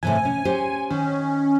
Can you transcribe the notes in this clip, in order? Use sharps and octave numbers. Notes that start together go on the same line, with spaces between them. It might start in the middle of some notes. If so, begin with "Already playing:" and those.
A2 C3 E3 G#5
C#4
C#4 G4 C5
D#3 C#4